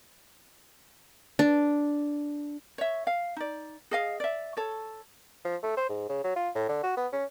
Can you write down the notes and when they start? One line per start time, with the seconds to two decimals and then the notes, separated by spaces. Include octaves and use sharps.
1.39 D4
2.78 C#5 E5
3.07 F5
3.36 D#4 D5
3.91 G#4 D#5 F5
4.20 D5 E5
4.57 A4 C#5
5.45 F3
5.63 A3
5.77 C5
5.89 G#2
6.09 C#3
6.24 F#3
6.36 F4
6.55 A2
6.69 D3
6.83 F#4
6.97 B3
7.13 C#4